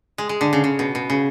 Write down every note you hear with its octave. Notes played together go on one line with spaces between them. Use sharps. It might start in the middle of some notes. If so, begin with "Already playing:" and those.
G#3
G#3
D3
C#3
C#3
B2
B2
C#3